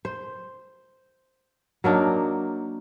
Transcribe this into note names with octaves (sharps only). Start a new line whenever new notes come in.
C5
F#3 A#3 D4 D#4